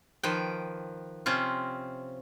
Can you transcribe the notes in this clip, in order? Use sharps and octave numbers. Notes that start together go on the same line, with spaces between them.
D#3 F3 B4 G5
C3 C4 C#4 F4